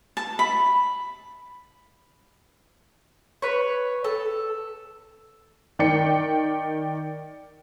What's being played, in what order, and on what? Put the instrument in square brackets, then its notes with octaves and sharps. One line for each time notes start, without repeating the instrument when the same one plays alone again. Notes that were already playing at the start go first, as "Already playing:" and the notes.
[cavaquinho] A5
B5
[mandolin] B4 C#5
A4
[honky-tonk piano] D#3 D5 G5 C#7